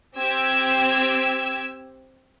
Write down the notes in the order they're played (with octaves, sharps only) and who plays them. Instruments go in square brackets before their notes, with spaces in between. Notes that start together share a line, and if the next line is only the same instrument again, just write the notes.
[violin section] C4 G4 E6 G#6